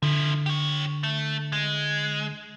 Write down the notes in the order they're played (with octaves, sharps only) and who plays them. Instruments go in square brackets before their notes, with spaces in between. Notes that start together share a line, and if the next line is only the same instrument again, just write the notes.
[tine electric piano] D3 [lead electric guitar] F3 E4
[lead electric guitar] G4 C#5
A3
G#3